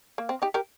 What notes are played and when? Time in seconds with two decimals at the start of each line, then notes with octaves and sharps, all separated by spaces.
0.18 A#3
0.29 C4
0.42 D#4 G4
0.54 G4 A#4